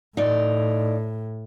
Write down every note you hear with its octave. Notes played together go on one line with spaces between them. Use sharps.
A2 D#4 D5